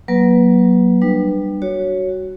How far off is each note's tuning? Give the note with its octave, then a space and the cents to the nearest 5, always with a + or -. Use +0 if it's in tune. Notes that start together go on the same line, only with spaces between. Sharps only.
F#3 +5 A#3 +35 B4 +0
G3 +0 D4 +35
F#4 +10 C#5 +0